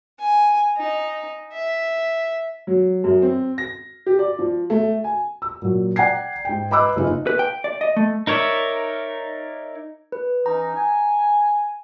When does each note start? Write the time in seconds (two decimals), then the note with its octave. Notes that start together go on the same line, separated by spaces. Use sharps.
0.20 G#5
0.77 D#4
1.53 E5
2.67 F#3
3.04 F#2
3.22 C4
3.58 A#6
4.06 G4
4.19 D5
4.39 F3
4.70 A3
5.04 G#5
5.42 E6
5.62 A#2 F#3
5.96 D5 F#5 G5 A#5 G#6 C7
6.45 G#2 G5
6.71 B4 D#5 B5 D6 E6 F#6
6.96 F#1 D#4 F4
7.27 B4
7.39 G5
7.64 D5
7.81 D#5
7.97 A3
8.27 D#4 A#4 C#5 D5 E5
10.12 B4
10.46 E3 C#4 D#4 A#5
10.75 G#5